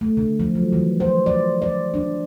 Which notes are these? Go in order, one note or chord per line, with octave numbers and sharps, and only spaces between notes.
A3
D3
F3
F#3
E3
C5
D5
D5
D4